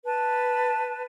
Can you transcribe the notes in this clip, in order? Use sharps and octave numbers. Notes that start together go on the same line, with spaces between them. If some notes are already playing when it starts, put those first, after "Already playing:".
B4 A5